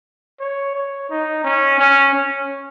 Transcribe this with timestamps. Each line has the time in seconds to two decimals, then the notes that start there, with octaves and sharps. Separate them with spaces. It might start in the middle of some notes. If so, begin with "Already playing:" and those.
0.40 C#5
0.75 C#5
1.10 D#4
1.44 C#4
1.79 C#4
2.14 C#4